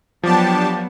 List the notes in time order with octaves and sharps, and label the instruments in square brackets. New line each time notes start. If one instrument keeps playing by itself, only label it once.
[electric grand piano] F3 [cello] F#3 B3 [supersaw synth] D4 G4 A5